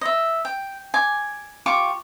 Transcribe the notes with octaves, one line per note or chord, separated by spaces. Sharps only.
D#5 E5
G5
G#5 D6
F4 G4 C#6 D6